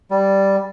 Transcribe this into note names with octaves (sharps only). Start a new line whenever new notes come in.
G3